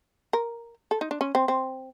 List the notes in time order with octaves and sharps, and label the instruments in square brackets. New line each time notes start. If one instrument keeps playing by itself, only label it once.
[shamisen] A#4
A4
D#4
D4
C#4
C4
C4